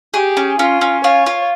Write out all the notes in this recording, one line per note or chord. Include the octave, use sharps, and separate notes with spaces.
G4 G#4
C#4
C#4 F4
C#4
F4 C#5
F4